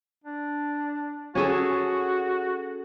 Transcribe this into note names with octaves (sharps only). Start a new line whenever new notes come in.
D4
C#4 F#4 G#4 A4